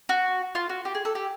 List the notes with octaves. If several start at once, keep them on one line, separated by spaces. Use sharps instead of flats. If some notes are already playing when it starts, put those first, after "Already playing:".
F#4
F4
F#4
G4
G#4
A4
G4